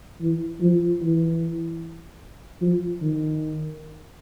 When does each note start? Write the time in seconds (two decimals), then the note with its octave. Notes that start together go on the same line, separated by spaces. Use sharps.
0.21 E3
0.61 F3
1.01 E3
2.61 F3
3.01 D#3